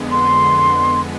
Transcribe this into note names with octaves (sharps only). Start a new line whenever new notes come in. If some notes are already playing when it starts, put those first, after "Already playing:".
Already playing: F2 D3 G#3 B3
C6